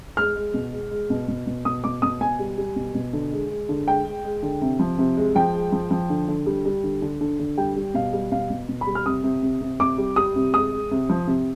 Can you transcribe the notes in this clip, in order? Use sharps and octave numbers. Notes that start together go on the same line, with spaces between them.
G#3 F6
G#3
B2
G#3
G#3
B2
B2
B2
B2 D#6
B2 D6
B2 D#6
B2 G#5
G3
G3
B2
B2
D3
G#3
G#3
D3
G#3 G5
G#3
G#3
D3
C3
F3
C3
G#3
F3 G5
G#3
F3
F3
D3
D3
G3
G3
D3
D3
D3
D3
G3 G5
G3
B2 F5
G3
B2 F5
B2
B2
B5
G3
F6
C3 D#6
C3
C3
C3
C3 D6
G3
G3 D#6
C3
G#3 D#6
G#3
C3
F3
C3